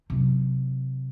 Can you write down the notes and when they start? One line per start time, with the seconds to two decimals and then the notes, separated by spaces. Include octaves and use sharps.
0.10 C3 F#3